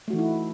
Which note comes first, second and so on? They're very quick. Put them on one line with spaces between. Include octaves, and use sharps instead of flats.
A3 F#4 E3 D#4 E4